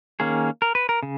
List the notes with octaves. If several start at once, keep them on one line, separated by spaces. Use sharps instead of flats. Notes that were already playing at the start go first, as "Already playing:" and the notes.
D#3 A#3 C#4 G#4
A#4
B4
A#4
C#3